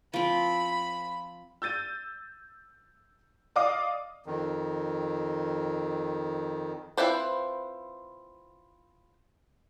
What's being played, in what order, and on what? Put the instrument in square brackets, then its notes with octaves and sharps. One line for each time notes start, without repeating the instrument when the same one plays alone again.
[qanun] F3 C4 [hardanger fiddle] B5
[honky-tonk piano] E6 G6 A6 D#7
D5 D#5 F5 D6 D#6
[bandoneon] F2 D#3
[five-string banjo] C4 E4 F4 B4 C5